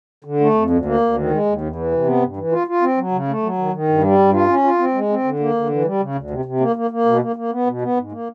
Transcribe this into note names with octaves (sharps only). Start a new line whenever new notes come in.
D3
A3
F2
D2
A#3
D2
D#3
G#3
D#2
E2
E3
C3
B3
G2
E3
F4
F4
C4
F#3
C#3
A3
F#3
D#3
D#3
G2
G3
G2
F4
C#4
F4
C4
G#3
C4
D3
A#3
D3
E3
G3
C#3
D2
C3
C3
A#3
A#3
A#3
B2
A#3
A#3
B3
B2
B3
G#2
A#3